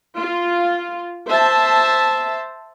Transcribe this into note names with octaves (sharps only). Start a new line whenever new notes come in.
F4
C5 E5 A5